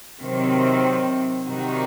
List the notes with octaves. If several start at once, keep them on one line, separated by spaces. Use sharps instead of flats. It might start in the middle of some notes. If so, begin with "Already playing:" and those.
C3 D#3 F#3 C4
C3 D#3 G3 D#4 F#4